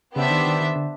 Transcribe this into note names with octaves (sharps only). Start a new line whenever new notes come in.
C#3 B3 D4 G4 C5 E5
D#3
D#3
D#3
D3